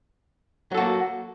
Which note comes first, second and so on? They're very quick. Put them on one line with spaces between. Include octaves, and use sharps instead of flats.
F#3 A4 F#4 A#3